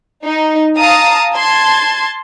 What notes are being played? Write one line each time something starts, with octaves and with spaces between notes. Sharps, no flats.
D#4
F5 A5 A#5 D#6
A5 C6 G#6